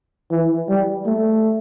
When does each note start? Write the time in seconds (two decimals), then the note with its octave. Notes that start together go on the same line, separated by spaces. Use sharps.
0.31 E3
0.69 G3
1.06 A3